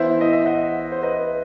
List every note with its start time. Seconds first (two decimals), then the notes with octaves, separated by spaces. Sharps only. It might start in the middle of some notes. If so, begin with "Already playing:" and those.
Already playing: E3 B3 E4 C5 E5
0.21 D#5
0.33 E5
0.45 D#5 F#5
0.92 C5
1.02 B4 D#5